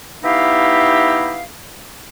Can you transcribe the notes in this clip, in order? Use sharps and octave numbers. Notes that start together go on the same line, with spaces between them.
B3 D#4 E4 G4 E5 F5